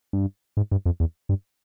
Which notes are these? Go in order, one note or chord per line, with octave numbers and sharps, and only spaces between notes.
G2
G#2
G2
F2
E2
G2